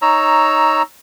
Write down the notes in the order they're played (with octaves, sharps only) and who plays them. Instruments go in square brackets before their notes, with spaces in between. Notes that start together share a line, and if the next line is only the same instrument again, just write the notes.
[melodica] D#4 C#5 A#5 E6